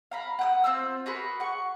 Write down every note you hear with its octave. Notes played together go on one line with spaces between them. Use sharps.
F5 A#5 B5
F#5 G5 D#6
C4 F4 C5 E6
F#4 G#4 A#4 B4
F#5 C#6